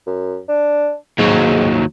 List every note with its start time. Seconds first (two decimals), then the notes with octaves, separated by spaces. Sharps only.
0.07 F#2
0.49 D4
1.18 D#2 G#2 F#3